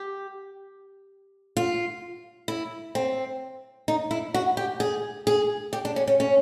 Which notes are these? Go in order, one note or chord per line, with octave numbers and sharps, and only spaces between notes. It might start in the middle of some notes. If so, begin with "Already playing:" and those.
Already playing: G4
F4
E4
C4
D#4
E4
F#4
G4
G#4
G#4
G4
D4
C#4
C#4
C#4